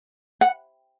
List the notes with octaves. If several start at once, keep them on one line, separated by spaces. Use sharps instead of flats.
F#5